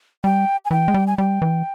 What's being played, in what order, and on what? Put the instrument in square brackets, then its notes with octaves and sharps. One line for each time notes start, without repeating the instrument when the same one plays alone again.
[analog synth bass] G3 [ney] G5
[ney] G#5
[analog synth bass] E3 [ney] G5
[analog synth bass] G#3
G3
[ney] G#5
[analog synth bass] G3 [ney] G5
[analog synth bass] E3